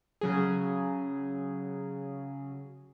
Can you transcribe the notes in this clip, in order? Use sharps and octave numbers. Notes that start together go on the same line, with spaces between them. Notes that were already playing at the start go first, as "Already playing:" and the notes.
C#3 F#3 G#4